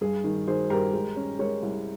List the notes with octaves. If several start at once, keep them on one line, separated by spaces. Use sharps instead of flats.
G2 G#4
D#3
D#3 G#4 C5
G2 G4 A#4
G#3
C#4
G#3 A#4 C#5
C2